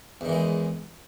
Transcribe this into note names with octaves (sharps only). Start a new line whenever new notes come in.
E2 D#3 E3 G#3